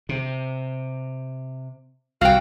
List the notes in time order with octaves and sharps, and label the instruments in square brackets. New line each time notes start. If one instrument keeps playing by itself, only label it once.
[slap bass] C3
[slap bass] C2 [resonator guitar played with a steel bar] F#4 G5 [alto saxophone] F5